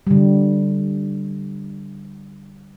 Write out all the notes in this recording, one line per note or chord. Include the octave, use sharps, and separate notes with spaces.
D3 G3